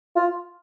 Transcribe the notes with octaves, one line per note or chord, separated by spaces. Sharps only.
F4